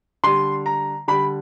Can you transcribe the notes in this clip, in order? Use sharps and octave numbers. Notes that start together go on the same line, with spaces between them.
D3 G3 C6
A#5
D3 G3 B5